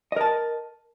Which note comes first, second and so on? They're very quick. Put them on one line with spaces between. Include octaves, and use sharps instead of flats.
D#5 A#4 A5